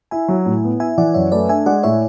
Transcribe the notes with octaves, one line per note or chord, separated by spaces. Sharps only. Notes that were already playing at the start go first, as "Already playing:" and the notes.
E4 E5 G#5
F#3
A2
B3
E4 E5 G#5
E3 D5 F#5
F#2 C#5 E5
A3 B4 D5
D4 E5 G#5
G#3 D5 F#5
A2 C#5 E5